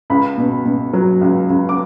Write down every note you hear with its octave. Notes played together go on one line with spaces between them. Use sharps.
C#2 B5
B2
B2
F#3
C#2
C#2
D6